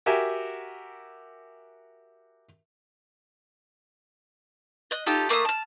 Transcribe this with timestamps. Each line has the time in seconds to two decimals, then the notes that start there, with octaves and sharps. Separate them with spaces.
0.06 F#4 G4 A#4 E5 G#5
4.91 D#5 F#6
5.06 D#4 F4 G4 A4
5.29 A3 A#3 E5 D#6
5.45 A5 F6